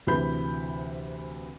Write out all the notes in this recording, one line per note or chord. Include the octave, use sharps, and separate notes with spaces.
D2 C3 E3 B4 B5 G6